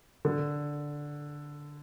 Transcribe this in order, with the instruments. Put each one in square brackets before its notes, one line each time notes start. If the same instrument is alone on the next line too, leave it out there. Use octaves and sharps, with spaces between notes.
[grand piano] D3